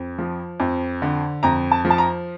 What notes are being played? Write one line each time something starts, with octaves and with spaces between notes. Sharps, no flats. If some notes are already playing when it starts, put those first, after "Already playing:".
Already playing: F2
F3
F2
D3
F2 A#5
A5
F3
A5
A#5